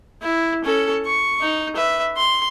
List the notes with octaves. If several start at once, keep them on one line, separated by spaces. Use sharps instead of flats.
E4
C#4 A4
C#6
D#4
B4 E5
C6